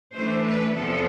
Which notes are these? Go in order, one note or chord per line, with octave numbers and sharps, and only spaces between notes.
E3 A3 D4 C5
B4
E2 C3 F3 B3 A4